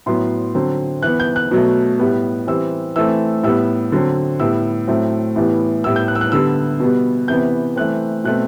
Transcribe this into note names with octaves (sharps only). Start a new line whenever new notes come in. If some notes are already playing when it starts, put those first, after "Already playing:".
A2 F#3 B3 C6
D3 F#3 C4
E3 B3 F#6
G6
F#6
B2 F#3 A3
A2 G3 B3
E3 G3 C4 E6
E3 A3 C4 E6
A2 G3 B3 E6
D3 F#3 C4
A2 G3 B3 E6
A2 F#3 A3 C4
A2 E3 G3 B3
A2 G3 B3 E6
G6
F#6
E6
F#6
D3 G3 B3 E6
B2 G3 B3
C3 E3 B3 G6
E3 A3 C4 F#6
B2 A3 C4 F#6